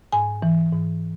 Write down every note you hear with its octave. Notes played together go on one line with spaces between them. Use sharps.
G#2 G#5
E3
G#2